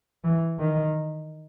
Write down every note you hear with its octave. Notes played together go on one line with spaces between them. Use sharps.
E3
D#3